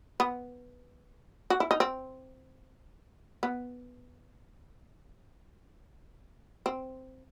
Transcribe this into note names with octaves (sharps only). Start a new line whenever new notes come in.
B3
F#4
E4
D#4
C4
B3
C4